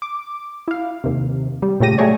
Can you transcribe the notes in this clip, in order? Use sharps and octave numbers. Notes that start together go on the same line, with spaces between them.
D6
E4 F5
D#2 C3
G3
A#2 C#3 A3 G4 A#6 D#7
F#3 A3 G4 G#4 C#5 D5